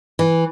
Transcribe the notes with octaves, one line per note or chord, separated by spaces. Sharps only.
E3